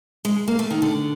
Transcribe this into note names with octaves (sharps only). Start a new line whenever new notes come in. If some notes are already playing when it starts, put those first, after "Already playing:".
G#3
A#3
A3
D#3
D3